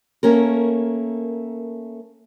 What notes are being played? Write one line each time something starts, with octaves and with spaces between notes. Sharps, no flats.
A3 A#3 C#4 A#4